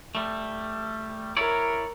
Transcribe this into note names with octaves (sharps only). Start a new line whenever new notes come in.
G3 A3
E4 A#4 C#5 D5